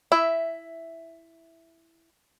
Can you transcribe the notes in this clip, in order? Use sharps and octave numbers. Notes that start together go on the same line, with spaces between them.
E4 E5